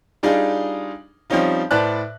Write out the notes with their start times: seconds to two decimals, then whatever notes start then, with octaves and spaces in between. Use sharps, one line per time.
0.23 G3 D4 D#4 F4 G#4
1.30 F3 G3 C4 C#4 D#4 F4
1.71 A2 B4 C5 D5 A5 F#6